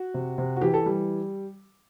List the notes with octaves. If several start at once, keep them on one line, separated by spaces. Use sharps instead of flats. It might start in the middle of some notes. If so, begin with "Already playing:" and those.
Already playing: F#4
C3
C3
F#4
E3 G4
A4
G3